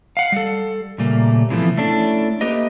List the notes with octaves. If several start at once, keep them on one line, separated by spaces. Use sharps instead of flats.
F5 F#5
G3 A4
A#2 C#3 G3 A3 A#3
C3 E3 F3 A3 B3
A3 C#4 D4 E4 A4
A3 A#3 G4 B4 D#5